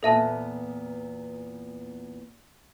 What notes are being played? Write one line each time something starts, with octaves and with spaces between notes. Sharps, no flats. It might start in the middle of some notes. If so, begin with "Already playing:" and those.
E2 A#2 B3 A4 E5 A5